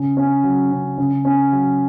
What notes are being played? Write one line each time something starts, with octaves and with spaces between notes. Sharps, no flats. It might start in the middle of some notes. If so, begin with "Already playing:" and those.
Already playing: C#3
C#4
F#3
C#3
C#3
C#4
F#3